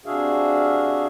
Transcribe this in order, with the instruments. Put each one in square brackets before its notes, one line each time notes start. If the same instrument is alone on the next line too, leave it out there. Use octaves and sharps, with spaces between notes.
[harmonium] C3 D4 F#4 G#4 E5 F5